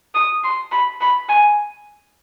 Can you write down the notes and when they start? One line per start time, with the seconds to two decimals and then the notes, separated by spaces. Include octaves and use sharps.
0.15 D#6
0.44 C6
0.72 B5
1.01 B5
1.29 G#5